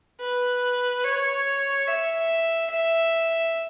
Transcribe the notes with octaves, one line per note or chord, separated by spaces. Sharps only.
B4
C#5
E5
E5